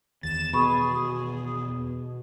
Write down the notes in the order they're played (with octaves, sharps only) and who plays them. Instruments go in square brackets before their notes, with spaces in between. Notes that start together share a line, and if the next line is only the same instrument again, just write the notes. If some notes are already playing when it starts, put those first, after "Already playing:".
[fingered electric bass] E2 D#3 [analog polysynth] A6 E7
[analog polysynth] B2 [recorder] G#4 [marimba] B5 C#6